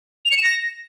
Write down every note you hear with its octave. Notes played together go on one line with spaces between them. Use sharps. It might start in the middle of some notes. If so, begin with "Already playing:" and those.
F7
C#7
E7
A#6